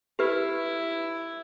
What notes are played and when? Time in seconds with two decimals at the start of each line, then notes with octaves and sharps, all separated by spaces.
0.19 E4 G4 B4